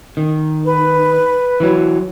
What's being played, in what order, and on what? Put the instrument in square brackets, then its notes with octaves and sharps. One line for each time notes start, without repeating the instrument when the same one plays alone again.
[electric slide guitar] D#3
[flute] B4
[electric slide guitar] E3 F#3